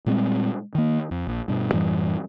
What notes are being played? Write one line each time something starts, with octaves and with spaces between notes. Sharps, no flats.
A#2 G3 G#3 C4
D#3 A#3
F2
A#1
G2 B2
F#2 A2 E3 G3